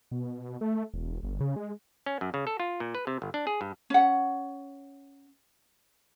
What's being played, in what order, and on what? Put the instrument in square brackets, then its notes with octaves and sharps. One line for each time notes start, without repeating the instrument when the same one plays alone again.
[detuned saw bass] B2
A3
E1
G1
C#3
G#3
[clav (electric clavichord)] C#4
F#2
C#3
A4
F4
A#2
B4
C3
G1
D4
G#4
G2
[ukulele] C#4 F#5